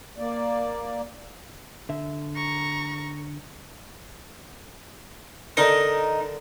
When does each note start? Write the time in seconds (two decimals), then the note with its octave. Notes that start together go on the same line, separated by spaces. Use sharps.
0.18 A#3 D5
1.89 D3 E5
2.36 A#5 C#6
5.57 D3 D#4 A#4